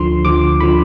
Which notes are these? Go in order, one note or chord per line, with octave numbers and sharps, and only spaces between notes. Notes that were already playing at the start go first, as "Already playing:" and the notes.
Already playing: D2 D3 F3 C6
D2 D3 F3 D6
D3 F3 B5